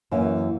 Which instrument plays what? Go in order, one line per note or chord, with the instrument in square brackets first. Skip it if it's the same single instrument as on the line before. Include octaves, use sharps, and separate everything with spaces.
[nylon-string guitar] F#2 E3 A#3 C#4